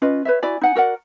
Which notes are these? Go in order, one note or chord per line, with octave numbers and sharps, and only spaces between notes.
C#4 F4 B4 D#5
B4 C#5 E5
E4 F#4 D5 G#5
D#4 F#5 G#5
F#4 A#4 D5 F#5